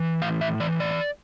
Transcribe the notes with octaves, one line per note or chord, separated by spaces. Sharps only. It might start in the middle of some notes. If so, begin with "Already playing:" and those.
Already playing: E3
A2 F5
E5
E3 D5
D5